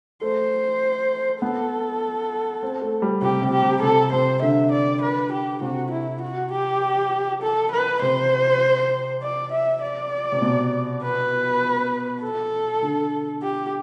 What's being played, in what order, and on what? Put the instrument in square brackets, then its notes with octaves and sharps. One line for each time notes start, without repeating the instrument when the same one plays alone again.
[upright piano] A3 [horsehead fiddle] C5
[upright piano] B3 [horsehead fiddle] A4
[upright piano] C4
A3
G3
[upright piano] C3 [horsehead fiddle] G4
[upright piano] C3
[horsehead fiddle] G4
[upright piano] C3
[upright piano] C3 [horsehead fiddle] A4
[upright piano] C3 [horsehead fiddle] C5
[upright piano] D3 [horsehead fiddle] E5
[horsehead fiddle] D5
B4
G4
[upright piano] C3 [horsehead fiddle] F#4
[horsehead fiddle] E4
F#4
G4
A4
B4
[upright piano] C3 [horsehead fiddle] C5
[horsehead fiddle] D5
E5
D5
[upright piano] C3
B2
[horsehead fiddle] B4
A4
[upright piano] D3
[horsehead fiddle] G4